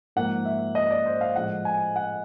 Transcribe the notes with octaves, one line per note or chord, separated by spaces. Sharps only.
G#2 F3 A#3 D#4 F#5
E5
D#5
D5
C5
F5
A2 F3 G#3 F#5
G#5
F#5